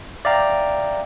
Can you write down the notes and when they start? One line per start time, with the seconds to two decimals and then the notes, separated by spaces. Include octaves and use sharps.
0.25 D5 E5 F5 G5 A#5